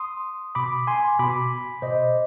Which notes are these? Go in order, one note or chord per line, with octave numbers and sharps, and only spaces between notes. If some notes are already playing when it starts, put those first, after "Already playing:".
Already playing: C6 D#6
B2 B5 D6
G#5 C6
B2 B5 D6
B2 C5 D#5